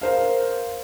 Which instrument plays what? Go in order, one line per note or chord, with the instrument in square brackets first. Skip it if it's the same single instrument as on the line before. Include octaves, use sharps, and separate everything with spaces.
[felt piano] A#4 C5 F5